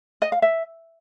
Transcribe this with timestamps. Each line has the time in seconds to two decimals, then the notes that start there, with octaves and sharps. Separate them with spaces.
0.22 D#5
0.32 F5
0.42 E5